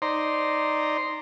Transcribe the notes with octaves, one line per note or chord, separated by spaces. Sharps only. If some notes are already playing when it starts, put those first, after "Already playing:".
D#4 C5 D5 A#5 C6